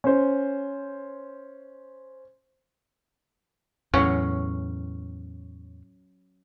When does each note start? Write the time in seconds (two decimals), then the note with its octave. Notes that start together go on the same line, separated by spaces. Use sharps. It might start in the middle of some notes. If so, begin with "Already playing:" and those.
0.04 C#4 C5
3.94 E2 A2 F#3 C#4